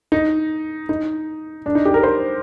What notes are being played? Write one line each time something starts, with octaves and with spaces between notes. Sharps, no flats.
D#4
D#4
D4
D#4
G4
A#4
C5